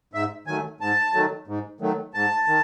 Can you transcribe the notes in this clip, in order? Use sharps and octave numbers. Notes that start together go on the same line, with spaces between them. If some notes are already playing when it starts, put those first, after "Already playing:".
G#2 E5
D#3 F#3 A3 G#5
G#2 A5
D#3 F#3 A3
G#2
D#3 F#3 A3
G#2 A5
D#3